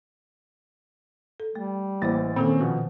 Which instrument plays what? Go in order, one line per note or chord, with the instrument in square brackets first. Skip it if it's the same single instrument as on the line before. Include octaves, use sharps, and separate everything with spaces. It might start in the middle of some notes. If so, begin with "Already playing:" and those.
[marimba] A4
[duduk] G3 [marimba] A3
[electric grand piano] A1 E3 A6 [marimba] A#3 E4 C5
[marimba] A#2 D#3 A4 [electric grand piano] A#3 C4 [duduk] C#4
[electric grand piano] B2 F3 B3